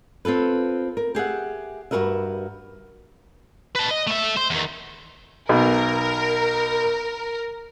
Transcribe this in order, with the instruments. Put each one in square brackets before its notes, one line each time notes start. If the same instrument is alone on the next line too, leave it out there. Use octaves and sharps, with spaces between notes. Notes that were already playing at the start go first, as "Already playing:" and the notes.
[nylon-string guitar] C4 F4 A4 B4
A#4
G4 G#4 E5 F#5
G2 B2 F#4 A#4 B4 E5
[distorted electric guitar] B4 A5
D#5
A3 E5
C5
E2 D#3
[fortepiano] B1 B2 [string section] A#4